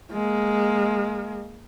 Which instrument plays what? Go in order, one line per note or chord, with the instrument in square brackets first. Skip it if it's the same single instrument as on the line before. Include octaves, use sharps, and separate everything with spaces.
[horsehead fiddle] G#3 A#3